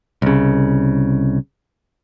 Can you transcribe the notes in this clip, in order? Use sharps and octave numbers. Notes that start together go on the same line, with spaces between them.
C2 C#3